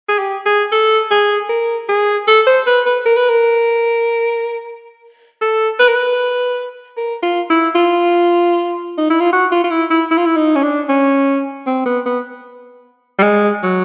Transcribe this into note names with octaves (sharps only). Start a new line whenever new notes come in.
G#4
G4
G#4
A4
G#4
A#4
G#4
A4
C5
B4
B4
A#4
B4
A#4
A4
B4
A#4
B4
A#4
F4
E4
F4
D#4
E4
F4
F#4
F4
F4
E4
E4
E4
F4
E4
D#4
C#4
D4
C#4
C4
B3
B3
G3
G#3
F#3